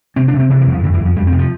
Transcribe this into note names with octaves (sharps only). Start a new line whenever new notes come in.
C3 C4
D4
C3
C4
C3 E3
E3
E2 F3
F2 D3
E3
F2
F3
F2 G3
C4
C3
F3